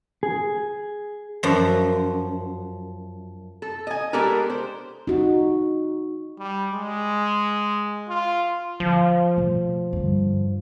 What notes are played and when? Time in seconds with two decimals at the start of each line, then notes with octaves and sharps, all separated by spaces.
0.23 G#4
1.43 F#2 F3
3.62 A4
3.87 D#5 G#5
4.13 G#3 B3 D4 G4 A4 A#4
4.50 C5
5.07 D#4 F#4
6.39 G3
6.73 G#3
8.09 F4
8.80 D3 F3
9.36 B2 A3
9.93 G2 D3